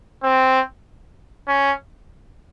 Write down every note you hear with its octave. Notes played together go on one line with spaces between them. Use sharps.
C4
C#4